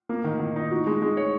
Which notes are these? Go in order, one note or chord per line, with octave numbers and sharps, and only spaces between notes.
A#3
D#3
D#3
D#4
F#4
G#3
G#3
C#5